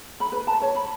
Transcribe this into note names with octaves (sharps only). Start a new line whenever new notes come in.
B5
B4
A5
C#5
B5